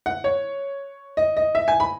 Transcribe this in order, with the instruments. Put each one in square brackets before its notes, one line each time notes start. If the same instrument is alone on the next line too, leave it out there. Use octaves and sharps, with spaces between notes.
[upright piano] F#5
C#5
D#5
D#5
E5
G#5
B5